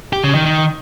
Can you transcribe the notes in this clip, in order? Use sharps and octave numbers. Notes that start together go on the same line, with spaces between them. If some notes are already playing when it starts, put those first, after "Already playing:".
G4
C#3
D#3
D#3